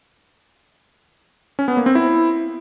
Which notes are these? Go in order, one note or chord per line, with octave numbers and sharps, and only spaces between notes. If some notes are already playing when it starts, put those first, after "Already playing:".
C#4
B3
A#3
C4
E4